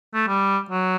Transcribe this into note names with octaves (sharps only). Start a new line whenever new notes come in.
A3
G3
F#3